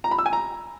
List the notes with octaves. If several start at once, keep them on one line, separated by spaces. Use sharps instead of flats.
A#5
B5
E6
G#5
A#5